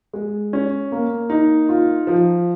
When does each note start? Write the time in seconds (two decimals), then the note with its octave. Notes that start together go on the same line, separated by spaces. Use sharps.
0.13 G#3
0.53 C#4
0.92 A#3
1.30 D#4
1.69 F4
2.07 F3